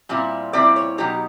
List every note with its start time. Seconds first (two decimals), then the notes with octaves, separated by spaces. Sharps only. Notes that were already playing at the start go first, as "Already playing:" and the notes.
0.09 A#2 G3 C4 E4
0.53 A#2 G3 C4 E4 D5
0.76 C#5
0.98 B2 F#3 A#3 D#4 G4